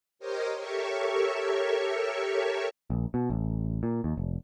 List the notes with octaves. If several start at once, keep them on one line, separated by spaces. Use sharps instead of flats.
G4 A#4 C5 C#5 D#5
G4 A4 A#4 C#5 E5 C#6
A#1
B2
A1
A#2
D#2
F1